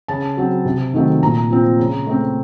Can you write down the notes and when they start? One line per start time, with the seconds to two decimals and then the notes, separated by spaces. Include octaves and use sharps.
0.08 C#3 A5
0.37 F#3 C4
0.65 C3
0.94 D#3 F#3 A3 C4
1.23 A#2 A#5
1.50 F3 C4
1.79 C#3
2.07 A3 C4